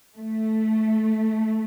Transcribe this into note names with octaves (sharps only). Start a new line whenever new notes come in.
A3